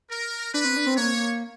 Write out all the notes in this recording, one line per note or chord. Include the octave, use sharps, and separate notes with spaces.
A#4
D4 B4
C4
D4
C4
A#3 C#5